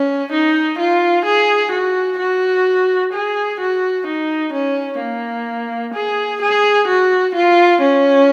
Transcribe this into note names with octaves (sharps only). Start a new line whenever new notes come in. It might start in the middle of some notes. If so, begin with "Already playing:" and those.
Already playing: C#4
D#4
F4
G#4
F#4
F#4
G#4
F#4
D#4
C#4
A#3
G#4
G#4
F#4
F4
C#4